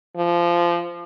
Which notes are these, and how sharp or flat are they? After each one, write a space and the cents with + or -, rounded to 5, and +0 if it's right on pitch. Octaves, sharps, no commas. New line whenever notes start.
F3 -20